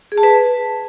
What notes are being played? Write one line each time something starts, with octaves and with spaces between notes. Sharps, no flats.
G#4
A5
B4